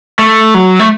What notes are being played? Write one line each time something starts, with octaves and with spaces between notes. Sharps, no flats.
A3
F#3
A3